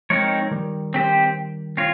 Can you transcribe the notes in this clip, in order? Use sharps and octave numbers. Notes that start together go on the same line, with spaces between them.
F3 G#3 C4 D#4 A#4 C#5
D#3 G3
C4 G4 C5
C4 F4 C#5